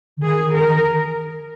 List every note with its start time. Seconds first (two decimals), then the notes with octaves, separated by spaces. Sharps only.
0.17 D3
0.23 D#3 G#4
0.54 A#4
0.68 D#3